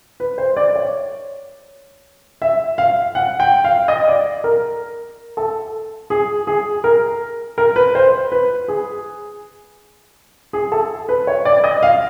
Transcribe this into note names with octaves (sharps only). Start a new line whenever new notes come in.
B4
C5
D5
C#5
E5
F5
F#5
G5
F5
D#5
D5
A#4
A4
G#4
G#4
A#4
A#4
B4
C5
B4
G#4
G#4
A4
B4
C#5
D5
D#5
F5